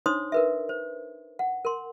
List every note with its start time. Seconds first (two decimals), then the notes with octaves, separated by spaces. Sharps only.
0.06 D4 D#4 C5 C#5 C6 D#6
0.32 A#4 B4 E5
0.69 C5
1.39 F#5
1.65 A#4 C6